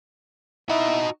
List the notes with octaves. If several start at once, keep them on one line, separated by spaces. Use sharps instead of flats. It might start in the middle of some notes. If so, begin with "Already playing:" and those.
D#4 E4 F#4 D#5